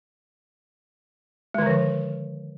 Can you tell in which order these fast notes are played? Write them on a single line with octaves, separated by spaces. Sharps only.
G#3 D#3 D3 F3